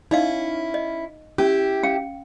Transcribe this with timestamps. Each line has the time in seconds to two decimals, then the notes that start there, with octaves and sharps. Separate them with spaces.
0.11 C#4 D#4 E4 D#5 F5
0.74 D#5
1.38 C#4 E4 G4
1.83 C#4 F5 G5